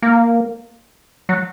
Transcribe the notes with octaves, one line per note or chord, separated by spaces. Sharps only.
A#3
F#3